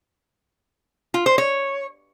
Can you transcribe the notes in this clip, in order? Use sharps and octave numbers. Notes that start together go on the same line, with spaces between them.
F4
C5
C#5